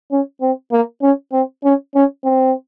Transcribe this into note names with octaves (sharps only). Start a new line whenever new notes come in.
C#4
C4
A#3
C#4
C4
C#4
C#4
C4